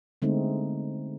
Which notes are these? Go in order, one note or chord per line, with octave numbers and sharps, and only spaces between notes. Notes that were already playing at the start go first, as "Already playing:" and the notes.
D3 G#3 A3 B3 C4 D#4